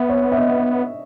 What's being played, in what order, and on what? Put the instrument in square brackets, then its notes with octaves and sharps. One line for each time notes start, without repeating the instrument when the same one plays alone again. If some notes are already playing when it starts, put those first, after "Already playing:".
Already playing: [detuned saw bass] B3 [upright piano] E5
[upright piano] C#5
E5
D#5